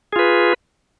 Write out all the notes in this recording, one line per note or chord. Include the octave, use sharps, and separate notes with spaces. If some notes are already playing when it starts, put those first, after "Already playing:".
F4 G#4 B4